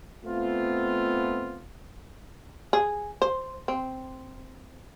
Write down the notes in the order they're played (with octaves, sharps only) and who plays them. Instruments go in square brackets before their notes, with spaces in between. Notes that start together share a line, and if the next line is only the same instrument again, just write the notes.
[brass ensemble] A3 B3 C4 F4
[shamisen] G#4
C5
C4